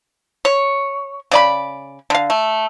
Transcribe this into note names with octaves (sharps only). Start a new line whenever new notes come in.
C#5
C#3 D5 B5
D3 F5
A3